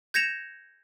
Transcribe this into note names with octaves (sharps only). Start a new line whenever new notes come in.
G6 G#6 A#6 C#7 E7 F7